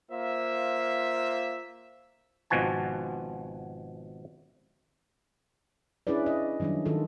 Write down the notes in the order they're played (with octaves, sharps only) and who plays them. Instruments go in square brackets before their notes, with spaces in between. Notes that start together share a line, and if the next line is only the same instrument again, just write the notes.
[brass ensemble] A#3 F4 C5 E5
[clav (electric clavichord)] G#1 B2 F3 F#4 G#5 A5
[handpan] C#4 D4 E4 G#4 B4 D5
D#5
D#3 F#3 G3 C#4 D4
D#3 F4 A4